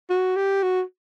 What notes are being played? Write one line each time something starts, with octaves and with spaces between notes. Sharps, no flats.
F#4
G4
F#4